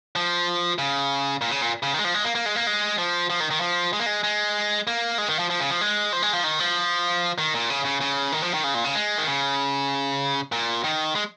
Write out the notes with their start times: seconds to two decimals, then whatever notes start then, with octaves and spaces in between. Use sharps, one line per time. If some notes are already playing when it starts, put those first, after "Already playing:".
0.16 F3
0.78 C#3
1.42 A#2
1.51 C#3
1.62 A#2
1.83 C#3
1.94 D#3
1.99 G#3
2.04 F3
2.14 G#3
2.25 A#3
2.35 A#3
2.46 G#3
2.56 A#3
2.67 G#3
2.98 F3
3.30 F3
3.40 D#3
3.51 D#3
3.61 F3
3.93 G#3
4.00 A#3
4.06 G#3
4.24 G#3
4.87 A#3
5.18 G#3
5.29 D#3
5.39 F3
5.50 F3
5.60 C#3
5.70 F3
5.81 G#3
6.13 F3
6.22 G#3
6.33 F3
6.44 D#3
6.60 F3
7.38 D#3
7.54 A#2
7.70 C#3
7.85 C#3
8.01 C#3
8.32 D#3
8.42 F3
8.54 D#3
8.64 C#3
8.74 A#2
8.84 C#3
8.95 G#3
9.18 D#3
9.27 C#3
10.52 A#2
10.84 D#3
11.15 G#3